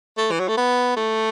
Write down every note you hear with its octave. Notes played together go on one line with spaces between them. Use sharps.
A3
E3
F#3
A3
B3
A3